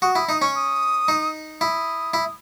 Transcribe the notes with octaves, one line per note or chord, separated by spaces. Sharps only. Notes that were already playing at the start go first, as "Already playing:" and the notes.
F#4 D#6
E4 D#6
D#4 D#6
C#4 C#6
D#6
D#4
E4 D#6
E4